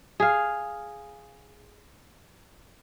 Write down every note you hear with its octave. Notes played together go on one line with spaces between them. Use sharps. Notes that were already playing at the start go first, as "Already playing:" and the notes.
G#4 F5